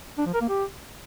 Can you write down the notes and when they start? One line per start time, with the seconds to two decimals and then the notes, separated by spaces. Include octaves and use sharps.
0.18 D4
0.26 F3
0.34 A#4
0.41 A#3
0.49 G4